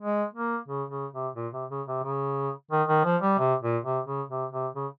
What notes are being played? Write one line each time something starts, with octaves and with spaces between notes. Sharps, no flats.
G#3
A#3
C#3
C#3
C3
A#2
C3
C#3
C3
C#3
D#3
D#3
F3
G3
C3
A#2
C3
C#3
C3
C3
C#3